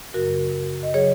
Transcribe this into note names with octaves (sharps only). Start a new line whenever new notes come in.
F#2 C#3 F#3 F#4 A#4
D#5
C#3 F#3 G#4 C#5